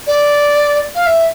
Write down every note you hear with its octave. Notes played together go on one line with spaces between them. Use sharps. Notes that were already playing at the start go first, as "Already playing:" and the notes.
D5
F5
E5